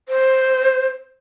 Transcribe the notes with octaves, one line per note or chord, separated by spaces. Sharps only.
C5